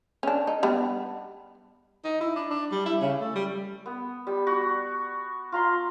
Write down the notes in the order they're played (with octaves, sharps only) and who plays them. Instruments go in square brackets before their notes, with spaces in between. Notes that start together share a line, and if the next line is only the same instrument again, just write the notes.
[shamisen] C#4 D4
D#4
G3 B3 D4
[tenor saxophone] D#4
E4
D4
D4
G3
E4
C#3
A3
G3
[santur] B3
G3
F#4
F4 A#5 C6